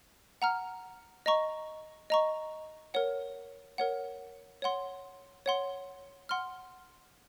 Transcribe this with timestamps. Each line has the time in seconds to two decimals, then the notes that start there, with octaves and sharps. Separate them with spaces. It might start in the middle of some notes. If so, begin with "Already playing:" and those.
0.42 F#5 A#5 F6
1.26 D#5 A#5 C#6
2.10 D#5 A#5 C#6
2.94 A#4 C#5 F#5
3.78 A#4 C#5 F#5
4.62 C#5 F#5 C6
5.46 C#5 F#5 C6
6.29 F#5 C6 F6